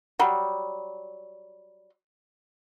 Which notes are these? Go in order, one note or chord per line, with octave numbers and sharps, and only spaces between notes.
F#3 G3